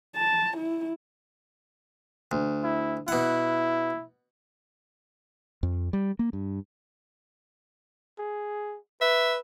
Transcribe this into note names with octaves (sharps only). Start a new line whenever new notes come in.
A5
E4
D2
E4
B2 E4 F#5
F2
G3
A#3
G2
G#4
B4 E5